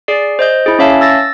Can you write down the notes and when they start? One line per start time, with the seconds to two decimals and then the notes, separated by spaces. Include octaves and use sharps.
0.08 G#4 D5 C7
0.39 C5 D#5 G6
0.66 E4 G#4
0.79 C#4 C#5 E5 F5 A5
1.01 E6 A6 A#6